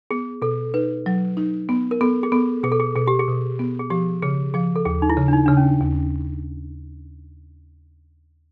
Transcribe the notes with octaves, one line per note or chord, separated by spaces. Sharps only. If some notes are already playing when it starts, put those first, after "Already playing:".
B3 G#4
B2 A4
D#4 B4
F#3
D#4
B3
A#4
B3 A4
G#4
B3 A4
B2 G#4
A4
G#4
B2 G#4
G4
G#4
B2
B3
G#4
F3 G4
C#3 G#4
F3 G#4
A4
D#2 G#4
D#4
E4
C#3
D4
D#4
C#3 D4
C#4
D#2